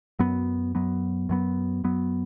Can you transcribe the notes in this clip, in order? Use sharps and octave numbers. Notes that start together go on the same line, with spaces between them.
F#2 F#3 B3
F#2 F#3 B3
F#2 F#3 B3
F#2 F#3 B3